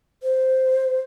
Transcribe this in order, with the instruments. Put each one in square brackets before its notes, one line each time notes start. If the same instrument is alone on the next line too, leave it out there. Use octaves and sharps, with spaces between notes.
[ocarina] C5